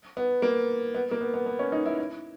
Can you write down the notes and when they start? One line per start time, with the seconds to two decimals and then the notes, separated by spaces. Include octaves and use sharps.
0.17 B3
0.42 A#3
0.95 B3
1.11 A#3
1.21 B3
1.34 B3
1.46 B3
1.59 C#4
1.72 D#4
1.86 E4
1.98 E4